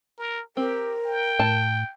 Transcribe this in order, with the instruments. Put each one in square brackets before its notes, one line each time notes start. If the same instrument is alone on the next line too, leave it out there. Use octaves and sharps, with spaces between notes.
[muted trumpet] A#4
[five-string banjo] C4 [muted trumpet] G4 [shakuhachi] A#4
[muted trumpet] G5
[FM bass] A2 [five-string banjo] A5